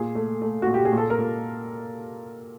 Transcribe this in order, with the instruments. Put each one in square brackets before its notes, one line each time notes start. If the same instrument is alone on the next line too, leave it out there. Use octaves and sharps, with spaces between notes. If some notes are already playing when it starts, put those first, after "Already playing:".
Already playing: [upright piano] A#2 G#4
A3
A3
A#2 F#4
G4
G#4
A#2
A4
A#4
A#2